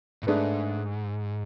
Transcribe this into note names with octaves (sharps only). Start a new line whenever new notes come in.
A2
G#2 A3 D4 G#4 B4